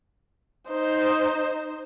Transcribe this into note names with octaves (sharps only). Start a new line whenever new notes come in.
D#4 C5